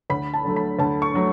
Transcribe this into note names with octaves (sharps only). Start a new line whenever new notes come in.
D2 B5
A5
D3 F#3 A3
B5
D2 A5
C#6
D3 F#3 A3